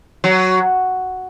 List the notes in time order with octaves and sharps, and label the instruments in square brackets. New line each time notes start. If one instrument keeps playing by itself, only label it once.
[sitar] F#3